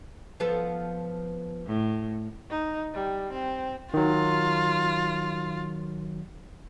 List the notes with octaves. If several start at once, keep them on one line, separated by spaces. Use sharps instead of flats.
F3 B3 A4
A2
D#4
G3
C4
D#3 F#3 F4